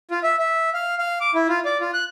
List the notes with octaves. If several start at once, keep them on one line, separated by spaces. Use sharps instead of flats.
F4
E5
E5
F5
F5
D6
E4
F4
D5
F4
F#6